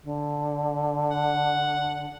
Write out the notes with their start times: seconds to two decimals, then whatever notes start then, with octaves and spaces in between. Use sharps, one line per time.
0.04 D3
1.10 F#5